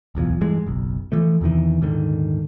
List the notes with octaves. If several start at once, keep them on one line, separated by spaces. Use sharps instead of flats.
D1 B1 E2 F3
G2 E3 G#3
F#1 B1
E3 F3 A3
E2 C3 D#3 E3
D#1 G#2 D3 D#3